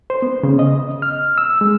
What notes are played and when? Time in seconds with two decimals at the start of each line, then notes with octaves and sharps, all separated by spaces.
0.10 C5
0.22 B3
0.43 C#3
0.59 D#5
1.02 F6
1.38 E6
1.61 G#3